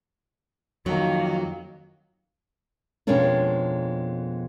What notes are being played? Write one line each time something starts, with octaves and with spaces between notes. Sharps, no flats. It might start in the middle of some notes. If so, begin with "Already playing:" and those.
F2 D#3 F#3 A#3
F2 B2 G#3 A#3 C#4 D4